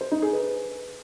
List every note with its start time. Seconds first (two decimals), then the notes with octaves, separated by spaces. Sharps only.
0.01 C5
0.11 D#4
0.22 G#4
0.33 B4